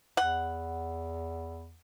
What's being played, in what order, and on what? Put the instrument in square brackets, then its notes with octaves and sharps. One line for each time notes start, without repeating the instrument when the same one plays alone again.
[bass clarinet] E2 [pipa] F#5